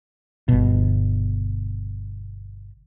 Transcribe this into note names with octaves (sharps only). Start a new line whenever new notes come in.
G1 B2